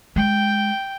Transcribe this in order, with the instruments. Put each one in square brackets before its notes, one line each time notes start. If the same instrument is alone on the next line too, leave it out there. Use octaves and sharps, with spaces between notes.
[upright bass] G#3 E4 [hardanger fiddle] G5